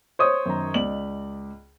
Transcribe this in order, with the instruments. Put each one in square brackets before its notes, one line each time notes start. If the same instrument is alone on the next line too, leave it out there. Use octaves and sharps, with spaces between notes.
[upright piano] C5 C#5 D#6
[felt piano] F#2 D#3 A#5
[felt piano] C#2 D5 D#5 [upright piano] F#7